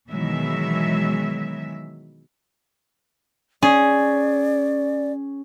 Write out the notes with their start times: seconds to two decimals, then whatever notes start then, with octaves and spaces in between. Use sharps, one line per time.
0.10 B2 D#3 E3 F#3 G#3 E5
3.63 C#4 G#4 D5